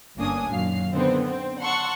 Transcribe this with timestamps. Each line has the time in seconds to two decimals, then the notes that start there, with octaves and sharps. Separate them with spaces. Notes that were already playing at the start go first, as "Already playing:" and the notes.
0.17 G1 A#3 C#4 D4 G#5 D#6
0.51 F#2 A#2 D#3 F#3 F5 C7
0.94 D3 D#3 B3 C4
1.26 C4
1.62 F#5 A5 C6 C#6 E6 F#6